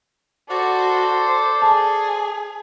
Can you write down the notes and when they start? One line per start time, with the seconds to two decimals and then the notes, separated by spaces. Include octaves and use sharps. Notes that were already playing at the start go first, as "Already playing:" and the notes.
0.50 F#4 A4 C5 D5
1.62 G#4 A5